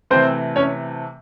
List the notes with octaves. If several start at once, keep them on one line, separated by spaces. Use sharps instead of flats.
C3 E3 A3 C4 C5
C#4 C#5